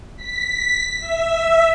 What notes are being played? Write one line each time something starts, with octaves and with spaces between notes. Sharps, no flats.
B6
E5